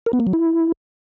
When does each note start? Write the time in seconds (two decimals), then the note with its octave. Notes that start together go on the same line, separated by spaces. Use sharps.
0.06 A#4
0.13 B3
0.20 A#3
0.27 F#3
0.33 E4